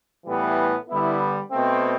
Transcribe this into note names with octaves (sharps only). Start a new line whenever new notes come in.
A2 E3 G3 B3
D3 G3 B3 E4
B2 A3 C4